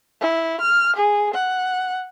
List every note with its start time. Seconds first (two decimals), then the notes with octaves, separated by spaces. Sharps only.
0.21 E4
0.61 F6
0.96 G#4
1.34 F#5